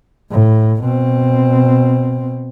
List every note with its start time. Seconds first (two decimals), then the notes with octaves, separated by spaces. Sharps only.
0.31 A2
0.83 B2 C4